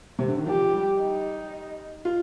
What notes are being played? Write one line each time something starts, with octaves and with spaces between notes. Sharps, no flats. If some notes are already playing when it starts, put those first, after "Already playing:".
C3
D3
D#3
F3 G4
G3
D#4
F4